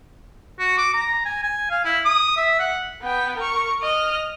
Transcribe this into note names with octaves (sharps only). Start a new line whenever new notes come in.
F#4
D6
A#5
G#5
G#5
F5
E4
D#6
E5
F#5
B3 G5
A#4 C#6
D#5 F6